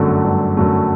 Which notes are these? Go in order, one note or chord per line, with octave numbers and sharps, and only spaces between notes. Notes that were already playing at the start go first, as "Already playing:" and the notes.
Already playing: G1 F#2 D3 F#3 A3
G1
F#2 D3 F#3 A3